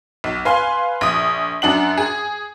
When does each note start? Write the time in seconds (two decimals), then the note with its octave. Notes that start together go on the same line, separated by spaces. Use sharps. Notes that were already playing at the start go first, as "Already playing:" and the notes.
0.24 B1
0.45 B4 F5 G#5 C6
1.01 A#1 D#6
1.62 F#2 D4 F#5 F#7
1.98 G#4